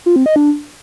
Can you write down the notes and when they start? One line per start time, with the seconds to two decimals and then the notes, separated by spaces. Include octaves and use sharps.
0.06 F4
0.16 C4
0.26 D#5
0.36 D4